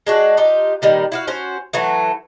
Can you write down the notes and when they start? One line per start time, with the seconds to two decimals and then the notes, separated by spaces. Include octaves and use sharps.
0.07 G#3 D4 F#4
0.37 D#4 F4 G4
0.82 A#2 D#3 G3
1.12 E4 F#4 F5
1.27 C#4 F#4 C5
1.73 E3 F#3 A3